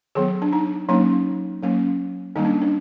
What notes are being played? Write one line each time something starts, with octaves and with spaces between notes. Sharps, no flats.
D#3 F#3 B3 G#4
D4
D#4
F#3 A#3 C#4 D#4
F#3 A#3 C#4
D#3 G3 A#3 C#4 D#4
D4
D4